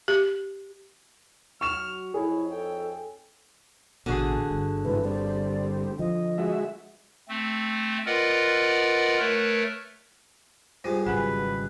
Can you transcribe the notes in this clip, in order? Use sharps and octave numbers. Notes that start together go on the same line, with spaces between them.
G4
F#3 C#6 F6 E7
F2 D#4 E4 G#4 C#5
A4 G5
A1 B2 D3 F#4 G#4
G1
G#2 C3 E3 B4
G3 C4 D5
F3 D#5
G#3 F#4 E5
A3 C4
F4 A#4 B4 D5 D#5 F#5
A3 A#4 B4 C#5
C2 G2 G#3 F4 C5
G#1 C#3 F#3 B4 F#5 G#5